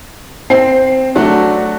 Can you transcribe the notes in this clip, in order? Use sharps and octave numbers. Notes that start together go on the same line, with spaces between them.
C4 C7
F#3 A3 D4 F#4